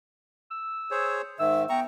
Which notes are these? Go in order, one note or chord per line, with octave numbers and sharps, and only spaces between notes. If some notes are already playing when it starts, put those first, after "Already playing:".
E6
G#4 C5 C#5
G#2 D#3 E5 E6
B3 G5 A#5 C#6